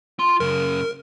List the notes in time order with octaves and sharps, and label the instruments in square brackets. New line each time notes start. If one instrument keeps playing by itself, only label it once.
[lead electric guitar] F4 C6
[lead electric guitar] F#2 C#3 [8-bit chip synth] A#4